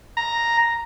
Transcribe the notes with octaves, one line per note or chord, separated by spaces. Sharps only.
A#5